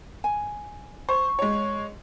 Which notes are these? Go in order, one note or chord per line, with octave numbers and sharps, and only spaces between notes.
G#5
C5 C#6
G#3 C#5